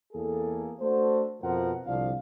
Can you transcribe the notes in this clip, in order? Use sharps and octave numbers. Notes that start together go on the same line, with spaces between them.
E2 A#3 G#4 A4
A3 D4 F#4 A4 C5
F2 B2 F3 A#4 C5 F#5
C2 D3 F3 D4 F5